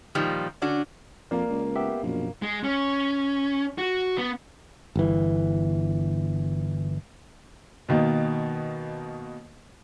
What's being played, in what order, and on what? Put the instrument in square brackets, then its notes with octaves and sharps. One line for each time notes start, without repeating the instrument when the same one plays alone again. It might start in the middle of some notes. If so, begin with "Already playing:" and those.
[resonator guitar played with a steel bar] A#2 D#3 F3 G3
D3 C#4 D4 F#4
[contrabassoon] F2 [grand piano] A#3 F5 [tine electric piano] D5
[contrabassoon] C#2
[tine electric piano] B3 G4 E5
[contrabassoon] A#1 [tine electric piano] F#2 B2
[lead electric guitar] G#3
C#4
F#4
B3
[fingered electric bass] G1 E3
[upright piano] B2 D#3 A#3